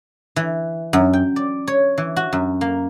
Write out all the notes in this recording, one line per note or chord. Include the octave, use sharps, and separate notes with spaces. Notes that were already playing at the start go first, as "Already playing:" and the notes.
E3
F#2
G5
D5
C#5
E3
F#4
F#2
A#3